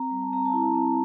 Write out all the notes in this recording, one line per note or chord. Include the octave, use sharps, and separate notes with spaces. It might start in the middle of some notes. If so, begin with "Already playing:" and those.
Already playing: C4 A#5
G3
A5
C4 A#5
A5
E4
C4